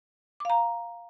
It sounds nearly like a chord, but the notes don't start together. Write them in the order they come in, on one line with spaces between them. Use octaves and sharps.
D6 F5 A#5